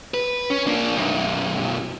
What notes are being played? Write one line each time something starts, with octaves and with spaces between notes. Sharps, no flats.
B4
C#4
A#3 D4
B1 F#2